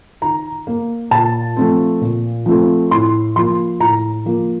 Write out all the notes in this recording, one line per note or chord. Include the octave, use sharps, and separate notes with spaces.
D#3 A#5
A#3
A#2 A5
F3 A3 C4
A#2
F3 A3 C4
A2 C6
F3 A#3 C6
A2 A#5
F3 A#3